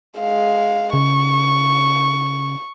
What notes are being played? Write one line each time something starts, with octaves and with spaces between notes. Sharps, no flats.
G#3 F5
C#3 C#6